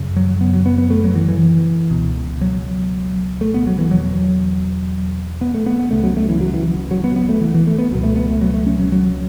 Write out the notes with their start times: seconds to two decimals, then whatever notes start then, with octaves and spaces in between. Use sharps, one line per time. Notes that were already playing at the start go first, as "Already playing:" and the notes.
Already playing: F#2 C#3
0.16 F#3
0.41 B3
0.53 F#3
0.66 B3
0.78 B3
0.90 A3
1.04 F#3
1.15 E3
1.29 E3
1.91 C#2 B2
2.41 F#3
3.41 A3
3.54 B3
3.67 F#3
3.79 E3
3.91 E2 B2 F#3
5.41 B3
5.54 A3
5.66 B3
5.79 B3
5.91 C#2 C#3 A3
6.03 F#3
6.17 A3
6.29 E3
6.41 F#3
6.54 E3
6.91 F#3
7.04 B3
7.16 B3
7.29 A3
7.41 E3
7.54 E3
7.67 A3
7.79 B3
7.91 C#2 B2 F#3
8.03 A3
8.16 B3
8.29 A3
8.41 F#3
8.54 A3
8.66 C#4
8.80 F#3
8.92 F#3